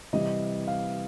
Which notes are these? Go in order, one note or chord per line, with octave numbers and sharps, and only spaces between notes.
C3 E3 G3 D#5
F5